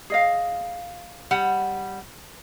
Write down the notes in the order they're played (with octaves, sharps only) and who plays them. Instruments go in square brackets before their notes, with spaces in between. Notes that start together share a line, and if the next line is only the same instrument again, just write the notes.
[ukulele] G#4 D#5 F5
[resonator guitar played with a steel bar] G3 F#5